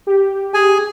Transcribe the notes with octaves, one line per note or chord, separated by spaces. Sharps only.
G4
G#4 G#5